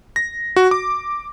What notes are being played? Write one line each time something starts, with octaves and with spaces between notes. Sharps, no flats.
A#6
F#4
D6